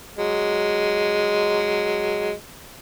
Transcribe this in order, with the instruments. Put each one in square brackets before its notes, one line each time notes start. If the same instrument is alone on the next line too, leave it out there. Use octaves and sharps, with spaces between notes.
[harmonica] F#3 G#3